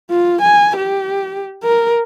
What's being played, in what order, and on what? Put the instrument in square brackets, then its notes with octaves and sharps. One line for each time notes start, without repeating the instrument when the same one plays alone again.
[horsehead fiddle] F4
G#5
G4
A#4